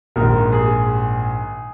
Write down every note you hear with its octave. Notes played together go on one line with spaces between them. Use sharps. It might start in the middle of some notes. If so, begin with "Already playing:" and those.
A#1 G#2 D#3 A#4
G#4